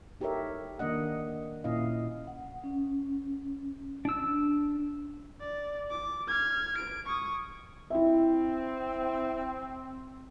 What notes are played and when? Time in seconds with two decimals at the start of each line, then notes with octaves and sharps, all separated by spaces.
0.20 D#4 G4 A4 A#4 C#5 E5
0.79 D#3 A#3 D4 D#5 F#5
1.64 A#2 C#4 E4 D#5 F5
2.27 F#5
2.64 C#4
4.05 D4 E6
5.40 D5
5.90 D6
6.28 F6 G#6
6.78 D7
7.06 C#6 D#6
7.90 C4 E4 E5